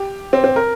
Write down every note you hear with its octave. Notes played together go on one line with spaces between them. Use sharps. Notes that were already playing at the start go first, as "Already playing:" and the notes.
Already playing: G4
C4
C4
A#4